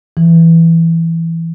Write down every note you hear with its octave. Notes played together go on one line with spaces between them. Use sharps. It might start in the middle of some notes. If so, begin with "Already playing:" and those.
E3